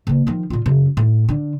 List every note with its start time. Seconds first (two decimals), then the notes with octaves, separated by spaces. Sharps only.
0.07 C#3 A#3
0.27 D#3 F3
0.50 A#2 F4
0.66 F#2 C#3
0.97 A2
1.29 D3